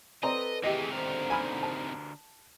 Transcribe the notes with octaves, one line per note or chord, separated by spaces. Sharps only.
C4 A4 B4 D5 D#5 A#5
C3 D#3 E3 A3 G4 G#4 D#5
D2 D3 A#4 C5
G#5 B5 F6
A5